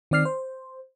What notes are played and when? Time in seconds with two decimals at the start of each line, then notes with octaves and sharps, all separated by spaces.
0.11 D#3 C4 D5 F6 C7
0.25 C5